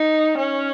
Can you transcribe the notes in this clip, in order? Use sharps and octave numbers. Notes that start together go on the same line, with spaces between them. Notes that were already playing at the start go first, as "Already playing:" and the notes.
Already playing: D#4
C#4